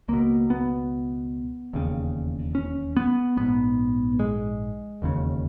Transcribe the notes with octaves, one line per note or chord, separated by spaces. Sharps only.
C#2 B2 A#3
B3
E1 D#2 C#3
C#4
B3
A#1 G#2 B3
G#3
E1 D#2 C#3